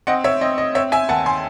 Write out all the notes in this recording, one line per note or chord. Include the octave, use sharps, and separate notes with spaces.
C4 D#5 F#5
C#5 E5
C4 D#5
D#5
C4 C#5 E5
E5 G#5
D#2 F#5 A5
G#5 C6